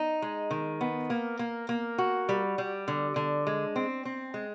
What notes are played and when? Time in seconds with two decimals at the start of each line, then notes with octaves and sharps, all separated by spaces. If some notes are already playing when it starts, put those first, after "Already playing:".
Already playing: D#4
0.22 G#3
0.51 D#3
0.81 B3
1.10 A#3
1.39 A#3
1.69 A#3
1.98 F#4
2.29 G3
2.58 G3
2.88 D3
3.16 D3
3.47 G#3
3.76 C4
4.05 C4
4.34 G#3